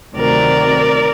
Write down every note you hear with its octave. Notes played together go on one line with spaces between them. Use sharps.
D2 C3 D#3 F#3 A#4 D5